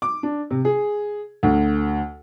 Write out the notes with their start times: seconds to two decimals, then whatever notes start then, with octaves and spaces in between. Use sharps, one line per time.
0.02 D6
0.23 D4
0.51 C3
0.65 G#4
1.43 D2